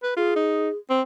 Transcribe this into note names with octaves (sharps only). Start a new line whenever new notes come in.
B4
F4 G#4
D#4
C4